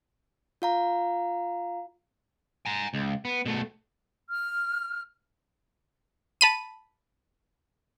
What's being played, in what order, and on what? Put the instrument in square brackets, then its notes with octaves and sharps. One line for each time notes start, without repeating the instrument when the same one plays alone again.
[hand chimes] F4 F5 A#5
[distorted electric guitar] G#5 A#5
C#2
B3
B2 A3
[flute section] F6
[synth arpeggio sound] A5 B5 D#7